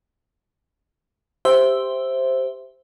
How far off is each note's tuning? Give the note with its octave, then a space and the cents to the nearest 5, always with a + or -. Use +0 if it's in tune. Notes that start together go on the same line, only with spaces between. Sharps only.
G4 +0 C5 +0 E5 +0